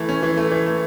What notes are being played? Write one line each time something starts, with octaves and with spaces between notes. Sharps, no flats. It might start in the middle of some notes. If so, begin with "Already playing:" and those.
Already playing: E3 A3
C#4
E3
A3
E3
A3